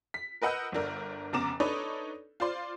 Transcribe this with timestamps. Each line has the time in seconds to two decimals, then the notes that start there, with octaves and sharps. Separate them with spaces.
0.14 B6
0.42 A#4 B4 D#5 F#5 E6 G6
0.72 G1 D3 D4 A#4
1.33 F1 C#3 B3 A#5 D6 E7
1.60 D4 D#4 A4 B4 C#5 D5
2.40 F4 C5 D5 C6